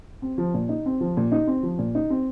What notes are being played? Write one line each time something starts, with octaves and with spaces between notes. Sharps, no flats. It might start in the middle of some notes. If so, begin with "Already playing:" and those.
C4
F3
A#2
D#4
C4
F3
A#2
D#4
C4
F3
A#2
D#4
C4